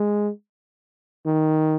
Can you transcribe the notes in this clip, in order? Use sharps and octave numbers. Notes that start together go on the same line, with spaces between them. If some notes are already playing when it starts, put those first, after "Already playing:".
Already playing: G#3
D#3